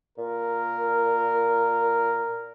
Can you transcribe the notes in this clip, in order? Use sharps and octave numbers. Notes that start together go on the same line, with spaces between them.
A#2 A#4